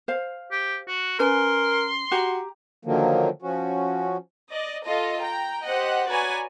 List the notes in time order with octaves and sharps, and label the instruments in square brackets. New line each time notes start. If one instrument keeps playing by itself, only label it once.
[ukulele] C5 F5
[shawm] G4
F#4
[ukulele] C#4 B4 G#5 [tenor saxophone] A#4 [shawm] C6
[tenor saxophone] F#4 [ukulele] G4 A#5
[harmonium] D3 D#3 F3 F#3 A#3
F3 C#4 F#4
[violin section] D5 D#5
F4 A4 D#5
G5 A#5
G4 C5 D#5 F#5
F#4 B4 C#5 D5 G#5 A#5